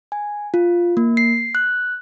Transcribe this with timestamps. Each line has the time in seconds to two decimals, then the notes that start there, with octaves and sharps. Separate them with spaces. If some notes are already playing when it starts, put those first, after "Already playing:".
0.12 G#5
0.54 F4
0.97 A#3
1.17 C7
1.55 F#6